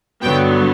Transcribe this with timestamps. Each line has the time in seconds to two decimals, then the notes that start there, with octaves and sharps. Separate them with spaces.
0.22 G1 G2 D3 F#3 B3 G5